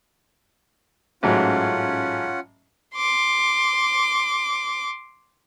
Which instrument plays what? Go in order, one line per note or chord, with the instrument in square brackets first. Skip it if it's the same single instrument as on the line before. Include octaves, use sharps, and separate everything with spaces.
[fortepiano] A1 G#2 F#3 [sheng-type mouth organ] C#4 F4 F#5
[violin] C6 D6